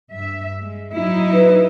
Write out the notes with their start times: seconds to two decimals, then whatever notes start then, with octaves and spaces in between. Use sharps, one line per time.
0.13 G2 E5
0.62 G#3
0.96 F#3 D#4 E4
1.34 B4